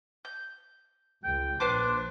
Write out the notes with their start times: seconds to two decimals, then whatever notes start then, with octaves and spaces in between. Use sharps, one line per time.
0.25 G6
1.24 C#2 G5
1.60 A#1 D4 B4 C5 D6